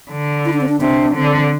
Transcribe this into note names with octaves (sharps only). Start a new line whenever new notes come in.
D3
E4
D4
C4
D4
C3 D4
D3 C4